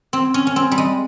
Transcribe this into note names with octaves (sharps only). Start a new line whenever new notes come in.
C4
C#4
C#4
C4
G3
G#3